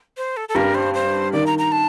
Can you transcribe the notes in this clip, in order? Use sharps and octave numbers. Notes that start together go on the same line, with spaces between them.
C5
A4
A4
G2 G3 A#4
C5
C5
D#3 D5
A#5
A#5
A5